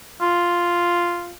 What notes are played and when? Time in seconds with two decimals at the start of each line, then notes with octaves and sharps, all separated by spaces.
0.22 F4